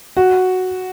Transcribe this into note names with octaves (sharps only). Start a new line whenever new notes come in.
F#4